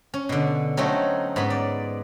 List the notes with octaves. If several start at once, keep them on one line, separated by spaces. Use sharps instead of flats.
C#4
B2 D3
F#3 A3 C4 C#4 D#4
G#2 B3 C#4 B5
D5